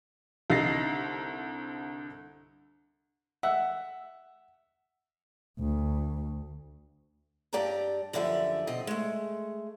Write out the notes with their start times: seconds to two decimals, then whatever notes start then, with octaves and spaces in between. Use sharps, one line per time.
0.50 C2 D3 D#4 A6 A#6 C7
3.43 E5 F#5
5.60 D2
7.53 G2 G4 D5 G5 A5 A#5
8.13 F#2 D3 F3 G3 D5 E5
8.67 B2 C4 D#5
8.87 G#3 A3